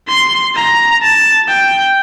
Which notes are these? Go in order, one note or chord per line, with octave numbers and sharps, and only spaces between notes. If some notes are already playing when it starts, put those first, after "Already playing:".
C6
A#5
A5
G5